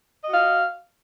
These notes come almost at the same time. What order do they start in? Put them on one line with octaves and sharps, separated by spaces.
D#5 F#4 F5